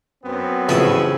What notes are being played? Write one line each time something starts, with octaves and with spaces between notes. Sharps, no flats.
F#2 B3 C4
A1 C#3 F3 A3 E4 D#6